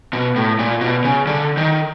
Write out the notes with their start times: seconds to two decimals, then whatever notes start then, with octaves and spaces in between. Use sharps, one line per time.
0.13 B2
0.36 A2
0.59 A#2
0.81 B2
1.04 C#3
1.27 D3
1.57 D#3